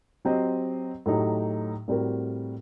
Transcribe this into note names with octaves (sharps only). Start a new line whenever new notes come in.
F#3 C4 G4 C5 D#5
A2 F#3 A3 D#4 G4
A2 G3 C4 F#4 A#4